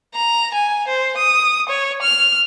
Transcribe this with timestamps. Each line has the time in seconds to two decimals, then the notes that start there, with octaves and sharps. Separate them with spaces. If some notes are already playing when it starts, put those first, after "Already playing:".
0.14 A#5
0.54 G#5
0.87 C5
1.17 D#6
1.69 C#5
2.02 F6